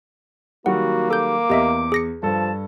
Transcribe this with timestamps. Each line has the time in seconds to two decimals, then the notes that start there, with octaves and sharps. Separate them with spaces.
0.66 D#3 F#3 G3 A#3 F#4 F#5
1.10 A4 D6 G6
1.50 E2 G4 D#5 E5
1.92 G#4 A#6 C#7
2.23 G2 F3 A4 A5